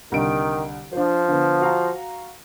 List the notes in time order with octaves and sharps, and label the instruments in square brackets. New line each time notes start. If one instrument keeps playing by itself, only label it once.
[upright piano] C2 D3 D7 [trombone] D#3
[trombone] F3 [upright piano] D4 C5
[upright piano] D3 B3
F#4 F5 A#5